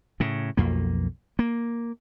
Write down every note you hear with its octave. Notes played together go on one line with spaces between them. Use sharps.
A2 C#3
B1 F2 A#3
A#3